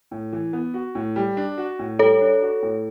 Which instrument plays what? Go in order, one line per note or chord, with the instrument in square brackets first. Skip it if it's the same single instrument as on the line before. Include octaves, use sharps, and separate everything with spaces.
[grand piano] A2
E3
B3
F#4
A2
G3
D4
F#4
A2
[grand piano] G3 [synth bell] A4 C#5
[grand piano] D4
F#4
A2